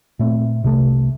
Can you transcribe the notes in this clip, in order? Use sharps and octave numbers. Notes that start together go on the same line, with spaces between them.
A#2 A3 C4
C2 C3 D#3 A3